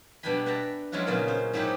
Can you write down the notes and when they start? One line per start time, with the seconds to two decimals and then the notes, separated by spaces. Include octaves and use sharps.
0.23 B2 G3 D4 G5 G#5 B5
0.46 B4 E5 F#5 G5 A5 A#5
0.92 F#3 G#3 C#4 E4 F4 F#5
1.07 A#2 C#3 F#3 B3 D#4
1.28 C#4 C5
1.53 G#2 F#3 D#4 E4 G4 F#5